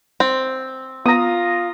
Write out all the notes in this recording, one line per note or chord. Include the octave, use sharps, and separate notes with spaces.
C4
B3 F4 A#5 D#6